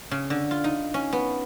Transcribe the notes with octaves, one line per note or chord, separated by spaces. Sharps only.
C#3
D3
F4
D#4
C#4
B3